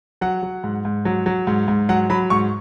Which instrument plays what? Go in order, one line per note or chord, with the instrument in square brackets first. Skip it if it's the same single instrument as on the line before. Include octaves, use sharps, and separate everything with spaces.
[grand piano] F#3 F#5
F#3
G#2
G#2
F#3
F#3
G#2
G#2
F#3 F#5
F#3 B5
G#2 C#6